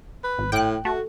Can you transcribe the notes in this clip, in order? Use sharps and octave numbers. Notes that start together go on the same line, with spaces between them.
B4
G#1
A2 G5 F#6
A3 F#4